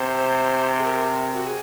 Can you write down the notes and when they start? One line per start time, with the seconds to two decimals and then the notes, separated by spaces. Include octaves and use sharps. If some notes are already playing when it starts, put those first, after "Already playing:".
Already playing: C3 C5
0.78 G#4
0.84 A#4
1.34 F#4
1.47 G#4